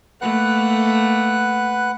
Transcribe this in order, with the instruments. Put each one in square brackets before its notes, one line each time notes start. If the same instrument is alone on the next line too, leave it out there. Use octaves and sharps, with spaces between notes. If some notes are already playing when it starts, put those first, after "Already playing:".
[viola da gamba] A3 A#3 [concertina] B4 F#5 F#6